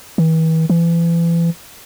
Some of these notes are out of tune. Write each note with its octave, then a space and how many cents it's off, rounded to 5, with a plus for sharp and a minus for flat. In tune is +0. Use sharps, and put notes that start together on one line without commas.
E3 -40
E3 +35